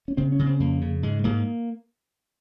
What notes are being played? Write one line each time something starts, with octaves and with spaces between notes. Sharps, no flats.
C#4
C#3 C4
C#4
C#3
C4
F2 A#3
C#3
G#2 G#3
G#2 A#3